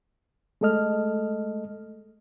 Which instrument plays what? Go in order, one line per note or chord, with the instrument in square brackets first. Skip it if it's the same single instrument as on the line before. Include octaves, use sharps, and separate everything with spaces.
[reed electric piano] G#3 A3 A4 D#5 F6